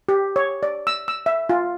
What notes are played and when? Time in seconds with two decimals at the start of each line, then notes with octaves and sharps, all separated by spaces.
0.09 G4
0.36 C#5
0.63 D5
0.87 E6
1.08 E6
1.26 E5
1.49 F4